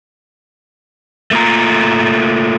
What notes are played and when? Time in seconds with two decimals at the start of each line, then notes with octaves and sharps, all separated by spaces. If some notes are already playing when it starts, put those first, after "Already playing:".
1.31 A3 A#3 F4 A#5